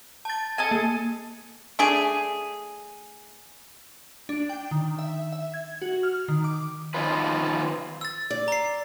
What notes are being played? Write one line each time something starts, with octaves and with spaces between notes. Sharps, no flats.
A5 A6
A4 D#5 G#5
A#3
A3 D4 G#4
D4
G5
D#3
E5
E5
G#6
F#4
F6
D#3
D6
D#3 F3 B3 C#4 F4 B4
E6 A6
D5
A#5 C7